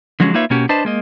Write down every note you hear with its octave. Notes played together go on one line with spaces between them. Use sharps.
D3 F3 F#3 G#3 B3 C#4
A#3 D#4 F4 B4 C#5 E5
B2 A#3 C#4 F#4 G4
D4 B4 C5 D#5 A5
G#3 A#3 D#5